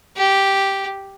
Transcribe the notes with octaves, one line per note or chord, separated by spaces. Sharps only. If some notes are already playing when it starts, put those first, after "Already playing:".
G4